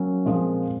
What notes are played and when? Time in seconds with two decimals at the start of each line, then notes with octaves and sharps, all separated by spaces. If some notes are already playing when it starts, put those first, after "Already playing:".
Already playing: F#3 A#3 C#4
0.25 A#2 F3 G#3 C4